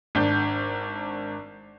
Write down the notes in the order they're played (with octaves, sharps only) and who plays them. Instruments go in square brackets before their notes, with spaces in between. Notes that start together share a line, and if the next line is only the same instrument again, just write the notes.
[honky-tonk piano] G#1 D4 G6